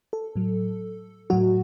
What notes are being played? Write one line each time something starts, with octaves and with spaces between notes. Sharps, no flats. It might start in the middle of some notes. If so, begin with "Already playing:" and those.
A4
A2 F#3
A2 F#3 F#4